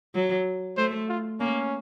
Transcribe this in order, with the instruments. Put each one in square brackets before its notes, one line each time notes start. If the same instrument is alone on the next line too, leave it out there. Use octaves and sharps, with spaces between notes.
[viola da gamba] F#3
[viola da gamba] A3 [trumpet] C5
[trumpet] F4
[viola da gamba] A#3 [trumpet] C#4